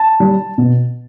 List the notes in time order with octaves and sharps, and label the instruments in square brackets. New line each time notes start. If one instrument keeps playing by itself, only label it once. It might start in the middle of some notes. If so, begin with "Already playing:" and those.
Already playing: [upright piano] A5
G3
B2